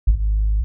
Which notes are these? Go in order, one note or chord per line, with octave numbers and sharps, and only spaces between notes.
G#1